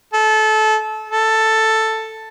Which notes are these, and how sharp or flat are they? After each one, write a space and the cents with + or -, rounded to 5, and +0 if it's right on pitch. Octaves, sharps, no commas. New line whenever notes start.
A4 -25
A4 +5